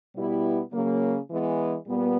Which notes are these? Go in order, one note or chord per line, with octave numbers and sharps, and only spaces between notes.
B2 G3 B3 E4 G4
C#3 F#3 A#3
E3 G#3 B3
A#2 G3 B3